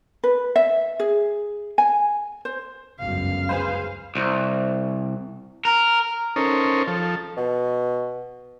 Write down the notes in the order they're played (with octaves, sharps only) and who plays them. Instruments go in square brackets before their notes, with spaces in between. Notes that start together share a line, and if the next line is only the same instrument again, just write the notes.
[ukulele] B4
E5
G#4
G#5
C5
[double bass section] G1 C#2 F#2 [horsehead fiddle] F5
[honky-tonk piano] G#4 B4 C5
[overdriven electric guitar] C2
A#4
[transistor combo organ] C#4 D#4 A4 A#4 C5 C#5
F3 A4
[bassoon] B2